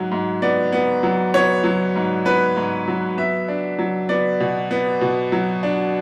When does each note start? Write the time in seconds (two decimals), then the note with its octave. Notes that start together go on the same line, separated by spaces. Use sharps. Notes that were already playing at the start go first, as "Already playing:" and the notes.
Already playing: G#2 F#3
0.11 G#2
0.42 B3 D5
0.72 B3
1.03 F#3
1.34 B3 C#5
1.64 F#3
1.95 G#2
2.25 B3 B4
2.56 G#2
2.88 F#3
3.17 B3 E5
3.48 D4
3.79 F#3
4.09 B3 D5
4.40 B2
4.71 B3
5.01 B2
5.32 F#3
5.63 D4